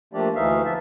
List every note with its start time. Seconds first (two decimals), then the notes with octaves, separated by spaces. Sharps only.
0.13 F3 A3 A#3 D4 G4 D5
0.35 D2 E3 A3 D#4 E5 F5
0.65 E2 F3 E5 A5